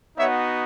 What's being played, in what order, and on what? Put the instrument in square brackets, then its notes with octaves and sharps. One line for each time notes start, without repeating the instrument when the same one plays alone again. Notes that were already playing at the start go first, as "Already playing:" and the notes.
[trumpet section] B3 D#4 F#4 C#5 E5